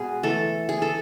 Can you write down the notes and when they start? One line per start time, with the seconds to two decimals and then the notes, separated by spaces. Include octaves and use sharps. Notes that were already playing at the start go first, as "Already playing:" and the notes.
Already playing: B2 G#3 B3 G#4
0.23 E3 A3 A4
0.69 G#4
0.82 A4